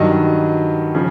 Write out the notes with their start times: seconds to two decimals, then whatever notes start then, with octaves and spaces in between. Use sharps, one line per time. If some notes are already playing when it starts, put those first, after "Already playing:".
Already playing: G2 D#3 F#3 D#5
0.95 C#3 F3